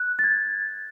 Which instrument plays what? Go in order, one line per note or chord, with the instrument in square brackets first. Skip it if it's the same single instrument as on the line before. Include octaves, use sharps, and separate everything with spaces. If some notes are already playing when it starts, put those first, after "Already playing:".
Already playing: [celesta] F#6
A6
G#6